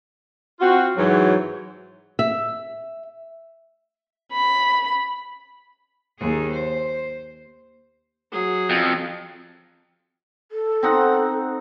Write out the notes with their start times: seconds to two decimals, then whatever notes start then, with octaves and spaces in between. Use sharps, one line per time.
0.60 C4 F4 F#4
0.96 G#2 E3 F#3
2.19 E5
4.32 B5
6.19 D#2 G#4
6.52 C5
8.32 F#3 G#4
8.70 F2
10.52 A4
10.83 C4 D#4 F#5